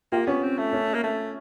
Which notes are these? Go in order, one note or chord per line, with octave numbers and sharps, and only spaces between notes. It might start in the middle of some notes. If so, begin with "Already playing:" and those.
A#3 F4 G4
B3 C#4
C4
A3
C#4
A#3
A3